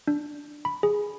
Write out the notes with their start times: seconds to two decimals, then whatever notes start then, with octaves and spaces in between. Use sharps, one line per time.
0.08 D4
0.65 B5
0.83 G#4